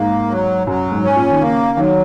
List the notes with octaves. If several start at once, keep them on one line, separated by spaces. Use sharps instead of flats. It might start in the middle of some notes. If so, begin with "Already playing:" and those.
Already playing: G#2 A#3
F#3
F#2 F#3
G#2
C#4
A#2
D#3
C#3 A#3
D#3 F#3